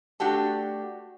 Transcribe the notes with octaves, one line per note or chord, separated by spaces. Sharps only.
A3 D4 F#4 G4 A5